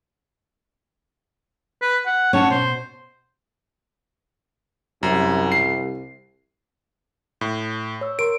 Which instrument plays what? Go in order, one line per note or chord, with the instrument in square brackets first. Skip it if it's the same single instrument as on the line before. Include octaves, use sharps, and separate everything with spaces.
[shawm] B4
F#5
[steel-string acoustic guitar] C#4 F#5 A5 [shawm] C#5
[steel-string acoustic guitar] B2 [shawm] C5
[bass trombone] C2 [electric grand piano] F#2
[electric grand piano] C7
A2
[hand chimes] C#5 E6
[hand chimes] A#4 C6 [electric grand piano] D7